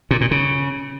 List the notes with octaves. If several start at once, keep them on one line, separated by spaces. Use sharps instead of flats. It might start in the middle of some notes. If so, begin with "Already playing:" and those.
A#2
A#2
C#3